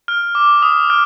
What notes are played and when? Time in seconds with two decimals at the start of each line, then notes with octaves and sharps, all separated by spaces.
0.08 F6
0.35 D6
0.62 D#6
0.90 F6